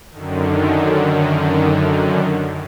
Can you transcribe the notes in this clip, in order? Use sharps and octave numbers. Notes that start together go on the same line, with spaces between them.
F#2 D3 D#3